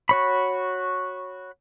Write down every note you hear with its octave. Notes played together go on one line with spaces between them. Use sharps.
F#4 C#5 B5